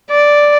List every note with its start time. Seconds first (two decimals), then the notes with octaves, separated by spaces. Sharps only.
0.10 D5